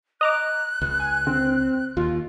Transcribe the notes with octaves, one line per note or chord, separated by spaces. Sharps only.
D#5 A#5 D6 F#6
C#2
G#5
D3 C4
D#2 F4